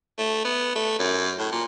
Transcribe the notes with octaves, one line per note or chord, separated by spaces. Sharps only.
A3
B3
A3
F#2
A2
A#2